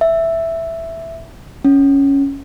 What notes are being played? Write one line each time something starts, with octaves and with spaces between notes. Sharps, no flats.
E5
C#4